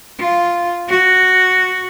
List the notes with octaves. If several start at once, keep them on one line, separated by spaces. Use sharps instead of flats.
F4
F#4